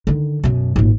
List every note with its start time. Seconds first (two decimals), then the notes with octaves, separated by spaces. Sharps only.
0.07 D3 D#3
0.44 F#2 B2
0.76 G#1 A#2